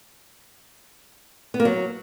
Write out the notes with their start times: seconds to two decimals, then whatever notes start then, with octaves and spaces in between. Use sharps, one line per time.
1.54 B3
1.60 A#3
1.65 F#3